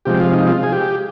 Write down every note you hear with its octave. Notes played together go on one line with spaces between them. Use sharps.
C3 F3 G#3 G4
F4
D#4
F4
G#4
G4